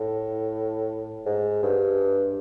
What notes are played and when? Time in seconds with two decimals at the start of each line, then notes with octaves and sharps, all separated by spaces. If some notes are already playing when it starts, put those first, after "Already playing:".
Already playing: A2
1.26 G#2
1.63 G2